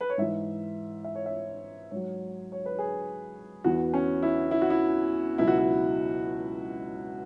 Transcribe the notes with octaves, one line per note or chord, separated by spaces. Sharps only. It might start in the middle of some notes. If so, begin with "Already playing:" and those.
B4
C#5
G#2 E3 E5
E5
C#5
E5
G#2 F#3 C#5
C#5
B4
G#4
E2 E3 F#4
C#4
E4
E4
F#4
E4
C#2 B2 F#3 E4
F#4
E4